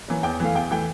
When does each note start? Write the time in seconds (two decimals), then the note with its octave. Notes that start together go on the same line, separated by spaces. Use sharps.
0.08 E3 A#3 C#4
0.23 E2 G5
0.40 E3 A3 F5
0.55 E2 G5
0.71 E3 A3 G5